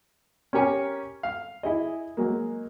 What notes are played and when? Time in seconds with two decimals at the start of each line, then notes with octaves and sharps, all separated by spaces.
0.53 C#4 G4 A#4 C#5 G#5
1.23 F5
1.63 E4 G#4 D#5
2.17 F#3 G#3 A#3